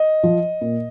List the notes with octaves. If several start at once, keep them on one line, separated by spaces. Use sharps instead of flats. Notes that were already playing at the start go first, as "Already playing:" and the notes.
Already playing: D#5
F3
A#2